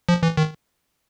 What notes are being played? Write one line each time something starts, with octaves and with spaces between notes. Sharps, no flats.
F3
E3
D#3